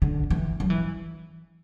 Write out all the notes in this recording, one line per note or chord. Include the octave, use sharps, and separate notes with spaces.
D3
E3
F#3
E3